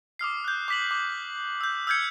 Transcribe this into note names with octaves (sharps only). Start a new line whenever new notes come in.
D6 D#6 F6 C7
F#6 G6
D6 B6 F#7
D6
E6 G6
E6 F6 G6 G#6 C#7